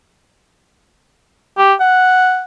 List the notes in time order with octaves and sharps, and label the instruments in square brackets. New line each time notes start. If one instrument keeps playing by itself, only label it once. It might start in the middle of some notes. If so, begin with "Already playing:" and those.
[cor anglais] G4
F#5